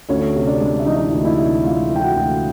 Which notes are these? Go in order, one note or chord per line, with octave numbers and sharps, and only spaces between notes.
D2 C#4 C#5
C3
D4 D5
G#3
E5
E3 D#4 D#5
D2
E4 E5
C3
G#3 F4 F5
E3
G5
F#4 F#5
D2